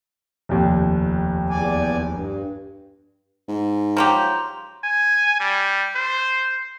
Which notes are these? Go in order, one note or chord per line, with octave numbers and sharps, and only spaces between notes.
F1 D#2
E2 D5 G#5
G2
G#2
F3 F#3 G4 A#5 C6 F7
G#5
G3
C5